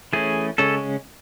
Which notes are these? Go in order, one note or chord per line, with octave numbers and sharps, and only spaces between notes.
E3 A3 C#4 G#4
C#3 G#3 C#4 A4